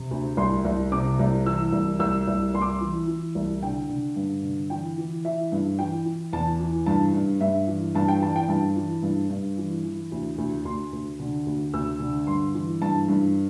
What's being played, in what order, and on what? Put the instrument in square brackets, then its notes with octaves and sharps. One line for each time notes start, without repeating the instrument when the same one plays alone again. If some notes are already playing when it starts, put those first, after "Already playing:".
Already playing: [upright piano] C3
D2
C2 C6
C2
C3 D6
C2
E3 E6
C2
C2 E6
C2
C2 C6
D6
C6
E3
E3
C2
D3 G5
D3
G2
D3
E3 G5
E3
E3 E5
G2
E3 G5
E3
E2 A5
E3
G2 A5
G2
G2 E5
E3
G2 A5
G5
E3 A5
G5
G2 A5
E3
G2
G2
E3
E3
D2
D2
D2 C6
D2
D3
D2
D2 E6
D3
G2 C6
E3
G2 A5
G2